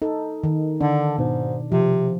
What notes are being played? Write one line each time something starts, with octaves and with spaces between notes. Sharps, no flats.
D#4 A4
D#3
D3 D4
G#2 B2
C3 F3